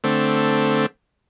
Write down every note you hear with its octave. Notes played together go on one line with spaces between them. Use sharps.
D3 A3 C4